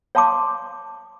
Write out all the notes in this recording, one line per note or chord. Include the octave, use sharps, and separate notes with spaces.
C#5 F5 A5 C6 D6